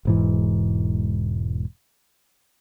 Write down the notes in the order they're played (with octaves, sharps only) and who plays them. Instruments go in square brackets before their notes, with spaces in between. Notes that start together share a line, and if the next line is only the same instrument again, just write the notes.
[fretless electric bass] E1 G#2 E3